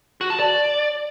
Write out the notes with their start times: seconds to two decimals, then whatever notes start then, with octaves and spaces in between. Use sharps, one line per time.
0.21 F#4
0.30 A5
0.39 D5